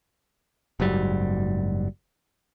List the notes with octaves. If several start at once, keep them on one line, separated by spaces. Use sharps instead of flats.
F#1 G#2 F#3 G3